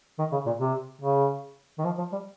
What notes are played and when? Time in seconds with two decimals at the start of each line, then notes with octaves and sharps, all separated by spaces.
0.18 D#3
0.32 C#3
0.46 A#2
0.60 C3
1.02 C#3
1.78 D#3
1.84 F3
1.98 F3
2.12 G3